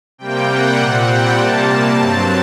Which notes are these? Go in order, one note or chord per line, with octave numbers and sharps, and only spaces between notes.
C3 G3 A#3 G5
F#5
A#2 G3 C4
G5
C3 G3 A#3 A5
G2 F#3 C4